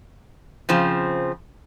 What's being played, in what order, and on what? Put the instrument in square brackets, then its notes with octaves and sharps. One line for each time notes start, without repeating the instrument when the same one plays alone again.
[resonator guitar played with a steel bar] C#3 F3 C4